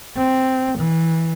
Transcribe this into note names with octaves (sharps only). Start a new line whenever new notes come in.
C4
E3